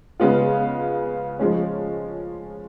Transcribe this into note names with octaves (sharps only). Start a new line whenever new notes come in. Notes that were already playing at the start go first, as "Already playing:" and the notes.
C#3 G#3 B3 F4
F3 G#3 C#4